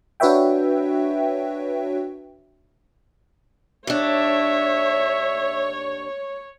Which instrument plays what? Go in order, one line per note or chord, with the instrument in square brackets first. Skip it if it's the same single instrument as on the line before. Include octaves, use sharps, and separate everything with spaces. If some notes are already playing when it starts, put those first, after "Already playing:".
[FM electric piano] D4 F#4 B4 C#5 E5 G5
[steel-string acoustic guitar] D#2 D4 [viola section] C#5 [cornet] E5